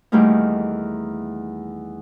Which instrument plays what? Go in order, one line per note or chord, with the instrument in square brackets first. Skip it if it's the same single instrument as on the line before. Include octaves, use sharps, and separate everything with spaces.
[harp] E2 D#3 G3 A3 A#3 D#4